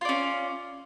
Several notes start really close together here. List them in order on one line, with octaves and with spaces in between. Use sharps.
F4 D5 C#4